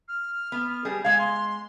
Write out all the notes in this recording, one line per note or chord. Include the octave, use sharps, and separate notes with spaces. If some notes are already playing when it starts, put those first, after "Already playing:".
F6
B3
G3 G#4
G#3 F5 G#6
C6